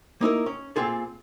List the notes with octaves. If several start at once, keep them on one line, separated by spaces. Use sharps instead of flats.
A#3 D#4 E4 A#4
C#4
A#2 D#3 C4 F4 G#4 A4